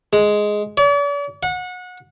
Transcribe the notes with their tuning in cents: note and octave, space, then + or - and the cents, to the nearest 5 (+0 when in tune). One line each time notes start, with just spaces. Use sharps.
G#3 +5
D5 -45
F#5 -25